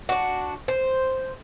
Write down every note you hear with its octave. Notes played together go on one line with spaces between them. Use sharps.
D4 F#4
C5